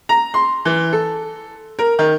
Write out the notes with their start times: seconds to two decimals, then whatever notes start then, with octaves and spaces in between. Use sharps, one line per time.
0.09 A#5
0.34 C6
0.65 E3
0.93 A4
1.79 A#4
1.99 D#3